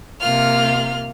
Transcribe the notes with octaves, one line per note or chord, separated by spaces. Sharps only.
C3 A#3 F4 F6